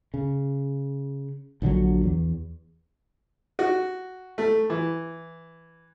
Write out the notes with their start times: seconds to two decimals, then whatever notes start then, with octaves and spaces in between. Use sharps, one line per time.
0.14 C#3
1.62 A#1 D3 F3 F#3
2.03 E2
3.59 F#4
4.38 A3
4.70 E3